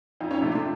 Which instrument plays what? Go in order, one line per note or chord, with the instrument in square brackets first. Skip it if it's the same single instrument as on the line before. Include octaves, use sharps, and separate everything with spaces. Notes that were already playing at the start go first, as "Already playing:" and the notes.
[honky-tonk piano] F2 D#4 F4
C#4 D#4
C3 F3 A3 D4
D4